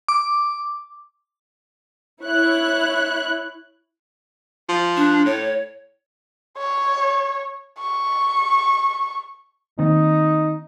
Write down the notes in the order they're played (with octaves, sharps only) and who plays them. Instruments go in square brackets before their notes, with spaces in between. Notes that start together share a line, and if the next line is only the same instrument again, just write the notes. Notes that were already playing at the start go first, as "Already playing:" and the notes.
[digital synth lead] D6
[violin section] E4 C#5 F#6
[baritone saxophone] F3
[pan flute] D4
[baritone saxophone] A2 [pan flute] C#5
[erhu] C#5
C#6
[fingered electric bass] D#3 A#3 C4 [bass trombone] D#4